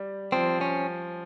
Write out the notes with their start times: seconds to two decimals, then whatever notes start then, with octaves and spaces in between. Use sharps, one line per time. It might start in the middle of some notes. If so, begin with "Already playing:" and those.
Already playing: G3 G4
0.32 F3 C4
0.61 C#4